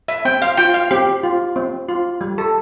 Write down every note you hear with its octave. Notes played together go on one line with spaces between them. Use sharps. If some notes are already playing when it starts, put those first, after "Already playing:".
E5
C4 G5
F5
F4 G5
F5
C4 G4
F4
C4
F4
G3
A4